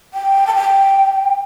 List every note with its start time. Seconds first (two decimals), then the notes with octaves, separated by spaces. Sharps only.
0.14 G5
0.47 A5
0.55 G5